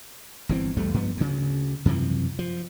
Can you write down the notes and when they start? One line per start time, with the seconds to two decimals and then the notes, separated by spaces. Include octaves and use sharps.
0.49 G1 E3 C4
0.77 B1 E2 G3 A3
0.94 G2 F3 B3
1.17 D2 C#3
1.85 F#2 C3 E3 F3
2.39 F3